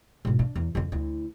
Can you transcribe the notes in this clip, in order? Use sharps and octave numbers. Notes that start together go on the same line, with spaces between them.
G#2 B2
D4
E2
F2 D3
D2 E4